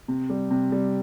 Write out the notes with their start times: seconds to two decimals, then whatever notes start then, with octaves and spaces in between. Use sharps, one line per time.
0.08 C3
0.30 G3
0.51 C3
0.72 G3